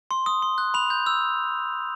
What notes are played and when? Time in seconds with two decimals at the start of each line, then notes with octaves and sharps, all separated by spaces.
0.11 C6
0.26 D#6
0.42 C6
0.58 F#6
0.74 B5 F7
0.90 G6
1.06 E6